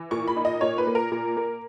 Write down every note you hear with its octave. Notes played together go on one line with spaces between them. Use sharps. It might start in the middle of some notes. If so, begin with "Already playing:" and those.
Already playing: E3
A#2 C#6
B5
D#4
D#5
A#2 C#5
B4
A#3
A#4
A#2
A#3